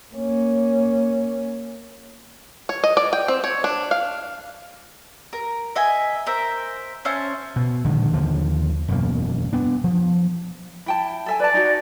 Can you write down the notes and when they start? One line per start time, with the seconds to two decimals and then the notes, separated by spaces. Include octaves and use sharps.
0.14 A#3 C#4
2.69 C#5
2.84 D#5
2.97 D5
3.13 G5
3.28 C4
3.44 C#5
3.64 D4
3.91 F5
5.33 A#4
5.75 D#5 E5 G#5
6.27 A#4 C5 E5
7.05 C#4 C5 E5 A5
7.56 B2
7.85 A#1 D3 D#3 G#3
8.13 D#2 D3 F3
8.88 E1 F#2 B2 A#3
9.53 B3 D4
9.84 F3
10.86 E4 G5 A5
11.26 A4 E5 G#5
11.40 B4 D5 A5
11.54 D#4 F#4